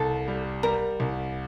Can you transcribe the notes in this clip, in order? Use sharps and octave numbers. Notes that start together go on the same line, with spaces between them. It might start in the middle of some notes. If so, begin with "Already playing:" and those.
Already playing: C2 A4
G3
G3 A#4
C2